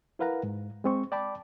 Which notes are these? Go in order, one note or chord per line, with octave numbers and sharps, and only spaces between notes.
E4 A#4 B4 F5 F#5 A#5
G#2
G#3 C4 C#6
D5 G5 A5 B5 D6